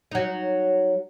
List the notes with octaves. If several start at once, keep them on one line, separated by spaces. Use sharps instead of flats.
F#3 D#4